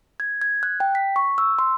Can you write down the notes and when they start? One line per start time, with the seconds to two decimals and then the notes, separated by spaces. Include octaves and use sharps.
0.20 G#6
0.42 G#6
0.63 F#6
0.80 G5
0.95 B6
1.16 C#6
1.38 E6
1.59 C6